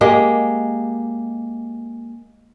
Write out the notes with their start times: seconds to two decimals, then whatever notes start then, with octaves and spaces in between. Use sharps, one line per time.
0.01 G#3 A#3 G4